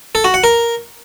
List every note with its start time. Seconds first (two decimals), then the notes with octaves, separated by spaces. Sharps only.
0.15 A4
0.24 F#4
0.34 F#5
0.44 A#4